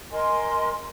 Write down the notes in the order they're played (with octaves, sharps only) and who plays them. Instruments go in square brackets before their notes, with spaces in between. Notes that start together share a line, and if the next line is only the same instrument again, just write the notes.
[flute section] A#4 D#5 G#5 C6